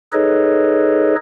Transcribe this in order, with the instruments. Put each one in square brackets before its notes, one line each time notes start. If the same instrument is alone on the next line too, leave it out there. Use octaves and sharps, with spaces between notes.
[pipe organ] D#4 G#4 A4 B4 C#5 D#5